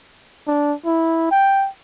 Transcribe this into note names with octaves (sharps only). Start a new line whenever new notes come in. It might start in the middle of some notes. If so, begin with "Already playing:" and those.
D4
E4
G5